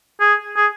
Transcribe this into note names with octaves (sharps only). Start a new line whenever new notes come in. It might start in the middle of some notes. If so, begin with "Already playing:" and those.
G#4
G#4